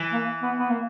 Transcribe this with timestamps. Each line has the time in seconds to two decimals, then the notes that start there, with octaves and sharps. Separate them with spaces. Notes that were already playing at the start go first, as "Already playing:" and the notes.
Already playing: E3
0.13 A#3
0.42 B3
0.59 B3
0.70 A#3